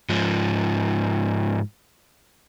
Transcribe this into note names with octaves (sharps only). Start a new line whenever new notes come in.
G#2 F3